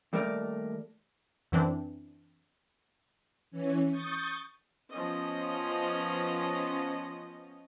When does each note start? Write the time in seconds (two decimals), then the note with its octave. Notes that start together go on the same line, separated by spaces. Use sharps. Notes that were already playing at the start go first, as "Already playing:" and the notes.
0.13 D#2 G3 A3 A#4 D5
1.52 F#2 E3 C4 D4
3.51 E3 C#4
3.90 C#6 D#6 G6 A6
4.92 F3 B3 C#4 D#5